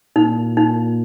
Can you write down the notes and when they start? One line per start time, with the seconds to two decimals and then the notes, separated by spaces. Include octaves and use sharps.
0.16 A#2 D#4
0.57 D#4